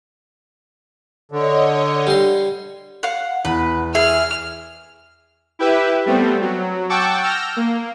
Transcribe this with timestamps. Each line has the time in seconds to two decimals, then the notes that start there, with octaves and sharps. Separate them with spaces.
1.32 D3 C#5 D#5
2.07 G3 C6
3.03 F5 F#5
3.45 E2 B4
3.95 G#4 E5 F6
5.59 E4 G4 B4 E5
6.06 G3 A3 B3 C4
6.41 F#3
6.89 F#5 G5 A5 C#6 D6 E6
7.21 E6 F6 G6 A#6
7.57 A#3